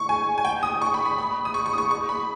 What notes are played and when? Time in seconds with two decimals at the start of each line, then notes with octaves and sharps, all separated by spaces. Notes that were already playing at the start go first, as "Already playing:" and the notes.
Already playing: C#6
0.09 G#5
0.38 G#5
0.45 G5
0.63 D#6
0.82 C#6
0.94 B5
1.06 B5
1.18 B5
1.45 D#6
1.54 C#6
1.66 C#6
1.73 D#6
1.78 C#6
1.91 C#6
2.09 B5